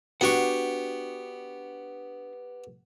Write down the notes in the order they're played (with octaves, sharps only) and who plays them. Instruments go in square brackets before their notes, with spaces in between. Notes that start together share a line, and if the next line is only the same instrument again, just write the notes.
[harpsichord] B3 G4 C#6 [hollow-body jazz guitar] D4 F#4 F#5